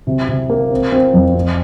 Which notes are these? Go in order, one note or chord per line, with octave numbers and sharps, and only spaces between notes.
C3
C3
A#3
C4
C4
F2
C4